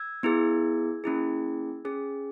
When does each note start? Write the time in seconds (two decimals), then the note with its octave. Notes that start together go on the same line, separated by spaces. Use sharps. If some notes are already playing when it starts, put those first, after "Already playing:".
Already playing: E6 G#6
0.23 B3 E4 G#4
1.04 A#3 C#4 E4 G#4
1.85 C#4 G#4